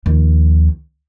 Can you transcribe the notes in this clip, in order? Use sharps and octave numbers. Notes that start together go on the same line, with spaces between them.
D#2 F3